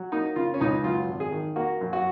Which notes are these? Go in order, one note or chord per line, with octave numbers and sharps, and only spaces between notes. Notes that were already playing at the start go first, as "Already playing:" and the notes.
Already playing: F#3
A#3 D#4
C#3 F4
C#4
C#2 D#4
F#2 F4
G#1
G#4
D#3
A#3 F#4
F#2
F#4